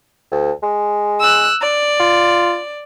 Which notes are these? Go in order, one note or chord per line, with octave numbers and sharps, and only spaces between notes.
D2
G#3
E6 F#6
D5
F4